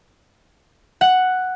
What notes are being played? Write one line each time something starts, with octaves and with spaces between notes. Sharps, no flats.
F#5